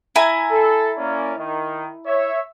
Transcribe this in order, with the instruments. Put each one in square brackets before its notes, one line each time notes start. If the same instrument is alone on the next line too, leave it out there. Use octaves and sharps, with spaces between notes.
[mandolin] E4 G#5 A#5
[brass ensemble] A4
A#3 C#4 D5
D#3
C#5 E5